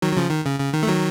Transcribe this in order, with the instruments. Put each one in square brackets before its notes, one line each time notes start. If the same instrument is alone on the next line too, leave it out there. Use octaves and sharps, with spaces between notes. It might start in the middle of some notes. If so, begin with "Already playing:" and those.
[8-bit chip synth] D#3 F#3
F#3
C#3 F3
D#3
C#3
C#3
D#3
A3
D#3 F#3